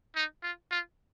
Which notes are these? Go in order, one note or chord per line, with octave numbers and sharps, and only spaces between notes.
D#4
F4
F4